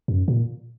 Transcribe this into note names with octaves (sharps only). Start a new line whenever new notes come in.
F#2
A#2